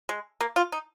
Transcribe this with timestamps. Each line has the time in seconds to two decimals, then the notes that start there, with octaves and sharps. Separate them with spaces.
0.09 G#3
0.40 A#3
0.56 F4
0.72 D#4